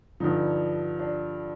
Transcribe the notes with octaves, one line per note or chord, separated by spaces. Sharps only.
G2 D3 F3 D#4
D4